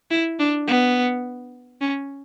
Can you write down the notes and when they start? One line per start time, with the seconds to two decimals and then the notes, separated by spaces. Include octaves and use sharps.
0.11 E4
0.40 D4
0.68 B3
1.81 C#4